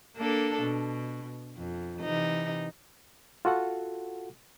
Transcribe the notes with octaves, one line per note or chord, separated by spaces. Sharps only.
A#3 D4 A4
B2
F2
C3 E3 D#4
F4 F#4 A4 F#5